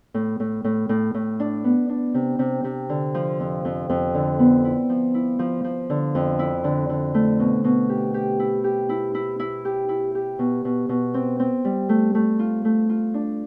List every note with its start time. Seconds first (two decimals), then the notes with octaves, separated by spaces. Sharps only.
0.14 A2
0.40 A2
0.64 A2
0.89 A2
1.14 A2
1.40 D4
1.64 B3
1.89 D4
2.14 C3
2.39 C3
2.64 C3
2.89 D3
3.14 F3
3.40 F2
3.65 F2
3.90 F2
4.14 D3
4.39 B3
4.65 E4
4.89 F3
5.14 E4
5.39 F3
5.64 F3
5.90 D3
6.15 F2
6.39 E4
6.64 D3
6.89 D3
7.14 A3
7.39 B2
7.64 B2
7.89 G4
8.14 G4
8.39 E4
8.64 G4
8.89 E4
9.15 E4
9.39 E4
9.65 G4
9.89 E4
10.15 G4
10.39 B2
10.65 B2
10.89 B2
11.14 C4
11.40 C4
11.65 G3
11.89 A3
12.15 A3
12.39 F4
12.65 A3
12.89 F4
13.14 D4